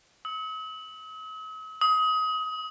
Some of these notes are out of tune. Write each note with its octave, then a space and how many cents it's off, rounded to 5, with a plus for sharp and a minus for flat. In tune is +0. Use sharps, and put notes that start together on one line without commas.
D#6 +45
D#6 +25